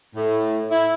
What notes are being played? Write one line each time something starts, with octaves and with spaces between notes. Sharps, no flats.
A2
E4